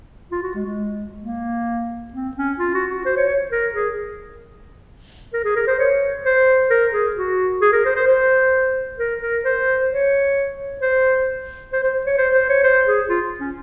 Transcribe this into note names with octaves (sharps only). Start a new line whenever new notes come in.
F4
F#4
G#3
G#3
A#3
C4
C#4
F4
F#4
F#4
C5
C#5
C#5
A#4
G#4
A#4
G#4
A#4
C5
C#5
C5
A#4
G#4
F#4
G#4
A#4
C5
C5
C5
A#4
A#4
C5
C#5
C5
C5
C5
C#5
C5
C5
C#5
C5
G#4
F4
C#4